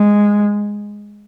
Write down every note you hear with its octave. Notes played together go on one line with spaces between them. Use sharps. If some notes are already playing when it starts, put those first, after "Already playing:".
Already playing: G#3